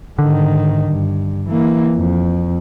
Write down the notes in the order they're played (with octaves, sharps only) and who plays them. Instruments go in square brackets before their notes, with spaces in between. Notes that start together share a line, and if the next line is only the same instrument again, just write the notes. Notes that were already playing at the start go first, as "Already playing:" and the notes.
[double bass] G#2 D#3 [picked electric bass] D3
[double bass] G2
E3 A#3
F2